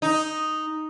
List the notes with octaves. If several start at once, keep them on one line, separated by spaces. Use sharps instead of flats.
D#4